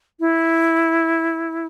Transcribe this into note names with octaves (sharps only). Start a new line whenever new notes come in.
E4